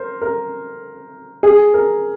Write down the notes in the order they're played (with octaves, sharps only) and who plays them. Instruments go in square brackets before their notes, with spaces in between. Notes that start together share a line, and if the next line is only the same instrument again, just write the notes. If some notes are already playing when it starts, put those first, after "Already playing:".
Already playing: [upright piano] A#4 C5
A#4
G#4
A#4